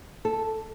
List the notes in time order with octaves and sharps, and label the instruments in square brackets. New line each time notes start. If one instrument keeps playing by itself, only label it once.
[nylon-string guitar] A4